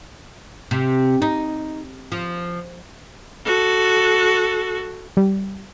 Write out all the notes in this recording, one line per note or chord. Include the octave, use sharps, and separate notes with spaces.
C3
D#4
F3
F#4 A4
G3